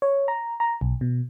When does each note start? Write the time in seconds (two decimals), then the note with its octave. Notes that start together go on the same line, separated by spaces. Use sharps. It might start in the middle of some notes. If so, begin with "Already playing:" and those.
0.02 C#5
0.28 A#5
0.60 A#5
0.81 B1
1.01 B2